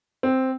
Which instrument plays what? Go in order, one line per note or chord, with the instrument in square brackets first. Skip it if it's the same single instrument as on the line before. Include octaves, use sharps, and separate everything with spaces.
[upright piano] C4